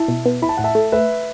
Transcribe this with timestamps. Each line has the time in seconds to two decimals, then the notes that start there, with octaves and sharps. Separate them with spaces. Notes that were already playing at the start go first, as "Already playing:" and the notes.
Already playing: E4 E5 A5
0.08 B2
0.26 B3
0.42 E4 B5
0.49 A5
0.57 A2 F#5
0.64 E5 A5
0.75 A3
0.92 A3 B4 E5